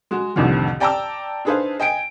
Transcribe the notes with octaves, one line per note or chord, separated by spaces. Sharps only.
G#3 F#4
C2 F2 A2 D3 D#3
D5 G5 A5 A#5 D6 E6
D4 D#4 G#4 B4 C5 F5
D#5 G5 G#5 D7